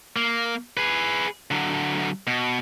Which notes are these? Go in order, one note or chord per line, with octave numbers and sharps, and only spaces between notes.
A#3
G#4 B4
D3 F#3
B2